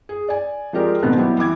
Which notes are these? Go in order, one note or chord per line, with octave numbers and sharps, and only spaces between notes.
G#4
D5 G#5
F3 G#3 G4 A#4 D5
G#2 B2 D#3 B3
F#3 G3 B3 E4 G4
E3 D6 G#6